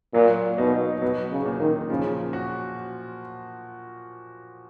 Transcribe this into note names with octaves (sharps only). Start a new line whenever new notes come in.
A#2 F#3
B2 D#4
B2 F#3
C#3
A#2
D#3
C#3 F3
F#4